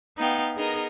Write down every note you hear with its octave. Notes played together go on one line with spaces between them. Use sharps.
B3 D#4 F5 G5
B3 D#4 G#4 A#4 D#5